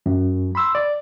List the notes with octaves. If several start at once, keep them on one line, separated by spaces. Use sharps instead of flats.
F#2
B5 C6 E6
D5